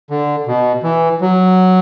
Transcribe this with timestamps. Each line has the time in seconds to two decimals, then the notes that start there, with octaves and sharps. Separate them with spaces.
0.10 D3
0.47 B2
0.83 E3
1.21 F#3